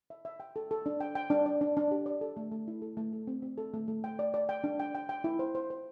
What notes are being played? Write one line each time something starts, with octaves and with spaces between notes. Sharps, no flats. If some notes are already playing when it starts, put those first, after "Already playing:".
E5
E5
G5
A4
A4
D4
G5
G5
D4
D5
D4
D4
G4
D5
A4
A3
A3
E4
A4
A3
A4
C4
C4
A4
A3
A3
G5
D5
D5
G5
D4
G5
G5
G5
E4
C5
C5
C5